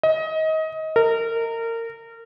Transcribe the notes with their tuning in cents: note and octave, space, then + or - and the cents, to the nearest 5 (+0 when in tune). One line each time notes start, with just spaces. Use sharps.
D#5 +25
A#4 -25